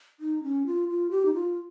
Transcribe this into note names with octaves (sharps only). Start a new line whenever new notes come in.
D#4
C#4
F4
F4
G4
D#4
F4